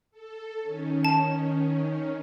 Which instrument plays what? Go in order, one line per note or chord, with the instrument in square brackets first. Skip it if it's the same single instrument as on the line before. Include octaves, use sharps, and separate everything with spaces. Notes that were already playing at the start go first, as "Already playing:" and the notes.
[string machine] A4
D#3 C#4
[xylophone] A5